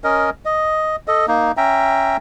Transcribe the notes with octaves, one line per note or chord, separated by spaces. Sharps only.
C#4 A#4 D#5
D#5
A4 D#5
A#3 D#4
C#4 E5 G5 A#5